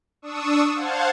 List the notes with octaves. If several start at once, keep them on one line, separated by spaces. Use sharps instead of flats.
D4 C#6 D#6 E6
C5 F5 F#5 A5 G#6